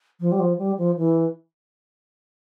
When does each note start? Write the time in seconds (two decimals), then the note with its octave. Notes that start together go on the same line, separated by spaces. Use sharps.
0.20 F3
0.32 G3
0.40 F3
0.58 G3
0.78 F3
0.97 E3